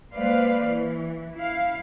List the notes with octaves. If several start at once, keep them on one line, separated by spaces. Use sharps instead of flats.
G#3 A#3 B4 C5 D5 F5
E3
E4 F5